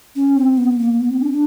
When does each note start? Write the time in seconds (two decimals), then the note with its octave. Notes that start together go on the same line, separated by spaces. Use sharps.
0.16 C#4
0.36 C4
0.57 B3
0.79 A#3
1.00 B3
1.10 C4
1.21 D4
1.31 D4